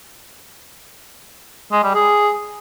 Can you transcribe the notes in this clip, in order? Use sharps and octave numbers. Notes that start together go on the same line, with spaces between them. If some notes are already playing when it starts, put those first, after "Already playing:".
G#3
G3
G#4